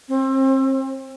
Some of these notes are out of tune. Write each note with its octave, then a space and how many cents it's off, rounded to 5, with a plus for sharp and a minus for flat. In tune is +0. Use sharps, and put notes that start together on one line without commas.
C4 +30